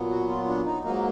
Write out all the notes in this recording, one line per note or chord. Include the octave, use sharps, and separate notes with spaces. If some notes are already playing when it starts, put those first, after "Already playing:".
Already playing: A#2 F#3 B3
F#4
F4
D4
D#4
G#2 F#3 A#3 D#4